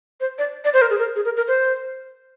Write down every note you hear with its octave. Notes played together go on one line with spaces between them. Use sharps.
C5
D5
D5
C5
A#4
G#4
A#4
G#4
A#4
A#4
C5